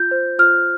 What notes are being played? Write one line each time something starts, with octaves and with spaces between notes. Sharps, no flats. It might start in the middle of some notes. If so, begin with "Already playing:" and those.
Already playing: F4 G6
C5
F4 F6